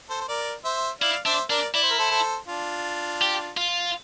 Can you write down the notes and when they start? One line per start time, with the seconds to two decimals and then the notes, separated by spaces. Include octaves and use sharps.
0.10 A4 C5
0.21 C5
0.28 A#4 D5
0.65 C5 E5
1.01 E4 D5 F5
1.25 D4 C5 E5
1.50 D4 A#4 D5
1.74 E4 D5
1.83 C5
1.90 A#4
1.99 A4 C5
2.11 A4 C5
2.48 D4 F4
3.22 G4
3.57 F4